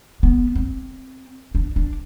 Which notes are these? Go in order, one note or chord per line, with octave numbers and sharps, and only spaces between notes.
B3
C4
D4
D4